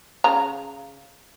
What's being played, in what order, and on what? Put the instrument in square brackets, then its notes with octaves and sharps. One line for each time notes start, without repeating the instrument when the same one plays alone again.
[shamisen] C#3 A#5